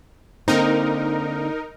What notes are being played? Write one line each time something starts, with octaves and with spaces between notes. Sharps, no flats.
D3 A#3 C4 D#4 A#4